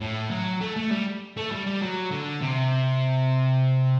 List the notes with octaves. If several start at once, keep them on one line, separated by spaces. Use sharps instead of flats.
A2
F#3
A3
A3
G3
A3
G3
G3
F#3
D3
C3